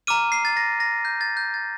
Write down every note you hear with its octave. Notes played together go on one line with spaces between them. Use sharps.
A#5 D6 F6 D#7
C7
A6
A#6
A#6
G6
A6
G6
A6